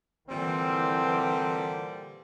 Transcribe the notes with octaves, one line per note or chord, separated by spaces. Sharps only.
A#2 D3 E3 G3 C4